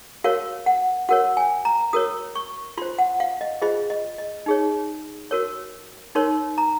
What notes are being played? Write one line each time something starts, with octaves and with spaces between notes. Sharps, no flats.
F#4 A#4 C#5 F5
F#5
F#4 A#4 C#5 F#5
G#5
A#5
F#4 A#4 C#5 D#6
C#6
F4 C5 C6
F#5
F5
D#5
F4 G#4 C5 D#5
D#5
D#5
D#4 G#4 C#5
F#4 A#4 C#5
D#4 A#4 C#5 C6
A#5